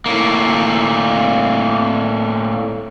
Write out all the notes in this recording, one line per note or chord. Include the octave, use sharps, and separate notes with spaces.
A2 A#3